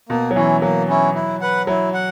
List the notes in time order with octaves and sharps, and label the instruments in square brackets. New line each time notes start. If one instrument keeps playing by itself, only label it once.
[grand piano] B2 [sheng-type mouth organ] A#3
[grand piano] F#3
[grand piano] E3 [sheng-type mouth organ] C#4 E4
[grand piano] F#3 [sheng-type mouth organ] A#3
[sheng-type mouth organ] C#4 E4
E4
B4 F#5
[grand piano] F#3 [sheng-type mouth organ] E4
[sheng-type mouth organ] F#5